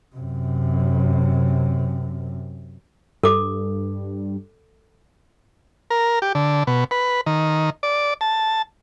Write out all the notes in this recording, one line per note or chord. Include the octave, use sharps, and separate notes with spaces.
F#2 C3
G2 A4 D6
A#4
G4
D3
B2
B4
D#3
D5
A5